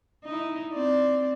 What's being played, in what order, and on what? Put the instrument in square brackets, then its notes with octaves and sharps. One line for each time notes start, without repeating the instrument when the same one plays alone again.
[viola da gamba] D#4 E4
C4 D5